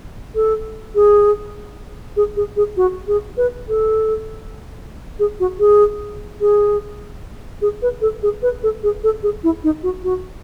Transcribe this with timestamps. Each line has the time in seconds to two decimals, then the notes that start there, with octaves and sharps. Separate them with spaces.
0.35 A4
0.95 G#4
2.17 G#4
2.36 G#4
2.57 G#4
2.77 F#4
3.08 G#4
3.37 B4
3.68 A4
5.19 G#4
5.40 F#4
5.60 G#4
6.41 G#4
7.62 G#4
7.82 B4
8.01 A4
8.23 G#4
8.42 B4
8.63 A4
8.83 G#4
9.03 A4
9.23 G#4
9.44 E4
9.64 D#4
9.83 F#4
10.04 F#4